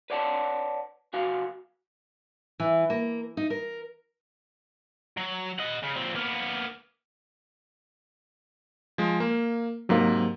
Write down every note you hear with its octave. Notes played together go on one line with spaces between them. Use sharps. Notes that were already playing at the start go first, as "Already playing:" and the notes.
B4 C#5 D5 F#5 G#5 A5
B1 C#3 F#4 F5 G#5
E3
A#3
D#4
A#4
F#3
D#5 F#5
C#3
A#2 C4
A#3 B3
F3 G#3
A#3
G#2 C3 F#3 A#3